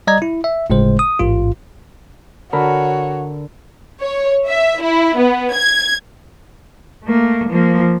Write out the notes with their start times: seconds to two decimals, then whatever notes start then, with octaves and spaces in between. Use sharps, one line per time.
0.07 G3 D5 D#5 A#5 G#6
0.22 E4
0.44 E5
0.70 G1 A2 C#3 G#3 C5
0.99 D#6
1.19 A1 G#2 F4
2.53 D3 F#4 A#4 C#5 B5
4.00 C#5
4.47 E5
4.80 E4
5.16 B3
5.54 G#6
7.04 A3 A#3
7.49 F3 A#3